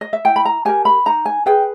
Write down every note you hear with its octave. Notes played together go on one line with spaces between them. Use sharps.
D#5
E5
E4 G5
B5
A#5
G4 A#4 G#5
B5
D#4 A#5
G#5
G#4 B4 G5